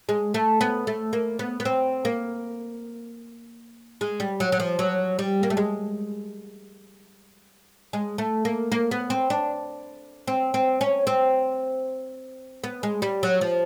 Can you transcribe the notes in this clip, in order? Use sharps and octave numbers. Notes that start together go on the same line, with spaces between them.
G#3
A3
B3
A3
A#3
B3
B3
C4
A#3
G#3
G3
F#3
F#3
F3
F#3
G3
A#3
A3
G#3
G#3
A3
A#3
A#3
B3
C4
D4
C4
C4
C#4
C4
B3
G#3
G3
F#3
F3